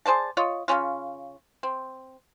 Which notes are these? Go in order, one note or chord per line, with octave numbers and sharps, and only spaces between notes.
G#4 C5 D5 A5
F4 C#5 D#5
C#3 G#3 C#4 F4
C4